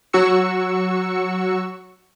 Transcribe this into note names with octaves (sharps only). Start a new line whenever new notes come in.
F#3 F#4 C#6 E6 C#7